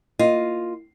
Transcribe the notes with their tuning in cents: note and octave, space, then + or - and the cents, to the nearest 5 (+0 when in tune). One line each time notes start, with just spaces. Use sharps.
A#3 +0 F4 +0 D#5 +0